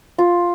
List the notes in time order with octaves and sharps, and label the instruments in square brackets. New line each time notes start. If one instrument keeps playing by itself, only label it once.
[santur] F4